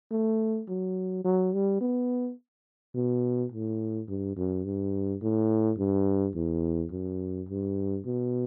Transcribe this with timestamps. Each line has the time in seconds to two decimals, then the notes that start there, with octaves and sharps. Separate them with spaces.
0.11 A3
0.69 F#3
1.24 F#3
1.53 G3
1.81 B3
2.95 B2
3.52 A2
4.08 G2
4.36 F#2
4.65 G2
5.22 A2
5.78 G2
6.35 E2
6.91 F#2
7.49 G2
8.05 B2